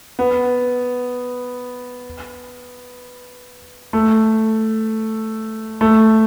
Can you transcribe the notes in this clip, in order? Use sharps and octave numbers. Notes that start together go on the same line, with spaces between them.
B3
A3
A3